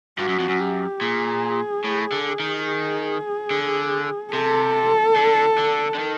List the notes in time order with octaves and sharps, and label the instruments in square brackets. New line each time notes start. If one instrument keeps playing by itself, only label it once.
[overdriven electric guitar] G2 [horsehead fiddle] F#4
[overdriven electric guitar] F#2
F2
F#2
[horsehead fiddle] G4
[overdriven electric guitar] A#2 [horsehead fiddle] G#4
[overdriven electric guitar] A2
D3
D#3
[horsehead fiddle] G#4
[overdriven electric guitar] D3
[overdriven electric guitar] C3 [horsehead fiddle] A4
[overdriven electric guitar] D3
D3
D3
D#3